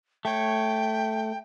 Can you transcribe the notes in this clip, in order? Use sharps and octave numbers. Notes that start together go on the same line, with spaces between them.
A3 C#5 G5